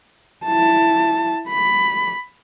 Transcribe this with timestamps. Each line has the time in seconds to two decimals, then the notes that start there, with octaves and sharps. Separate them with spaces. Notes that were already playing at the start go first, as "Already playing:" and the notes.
0.46 E4 A5
1.49 B5